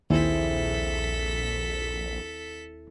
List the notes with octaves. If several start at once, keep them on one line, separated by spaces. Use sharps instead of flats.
A#1 D#2 C4 E4 G#4 A4 B6